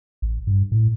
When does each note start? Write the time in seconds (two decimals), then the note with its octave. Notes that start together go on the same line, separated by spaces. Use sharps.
0.22 A1
0.47 G2
0.72 A2